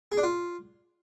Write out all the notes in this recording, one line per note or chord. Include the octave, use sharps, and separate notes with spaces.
G#4
D4
F4